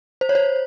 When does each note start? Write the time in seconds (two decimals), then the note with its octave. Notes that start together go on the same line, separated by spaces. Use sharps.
0.21 C5
0.29 C#5
0.35 C5